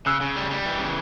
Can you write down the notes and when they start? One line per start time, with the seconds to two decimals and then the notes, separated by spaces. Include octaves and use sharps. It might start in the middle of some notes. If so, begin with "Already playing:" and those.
0.06 C#3 E6 F#6
0.21 C#3
0.36 G3
0.51 G3
0.66 E3
0.79 C#3